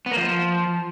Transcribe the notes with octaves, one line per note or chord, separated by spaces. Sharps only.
B3
A#3
F3